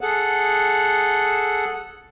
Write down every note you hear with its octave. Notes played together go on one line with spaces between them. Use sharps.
G#4 A4 F#5